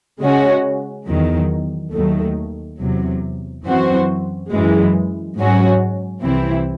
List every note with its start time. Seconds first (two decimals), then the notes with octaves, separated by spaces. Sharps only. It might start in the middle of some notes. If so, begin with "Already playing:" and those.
0.21 C#3 G#3 C#4 F#4
1.07 E2 D#3 F#3
1.93 D#2 D#3 F#3 A3
2.78 E2 C3 F#3
3.65 F#2 E3 C4 F#4 C5
4.51 F#2 E3 G#3
5.37 G#2 F#3 C#4 F#4
6.23 C2 C3 E3 C4 E4